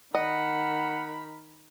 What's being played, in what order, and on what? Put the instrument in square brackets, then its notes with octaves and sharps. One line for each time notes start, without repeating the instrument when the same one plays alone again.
[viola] D#3 B5 [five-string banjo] D#5 [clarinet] F#5